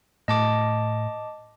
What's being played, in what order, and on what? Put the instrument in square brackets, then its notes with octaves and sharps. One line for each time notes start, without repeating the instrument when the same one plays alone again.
[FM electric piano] A2 [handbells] D#5 A5 D6